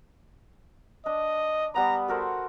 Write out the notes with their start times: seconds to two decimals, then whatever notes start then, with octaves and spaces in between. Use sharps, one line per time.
1.06 D4 D#5
1.74 G3 B3 A#5 D#6
2.08 F#4 A4 A#4 C5